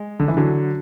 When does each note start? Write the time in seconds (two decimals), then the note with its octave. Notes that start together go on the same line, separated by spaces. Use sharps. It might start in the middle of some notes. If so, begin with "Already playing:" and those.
Already playing: G#3
0.20 D3
0.28 E3
0.37 D3 F#3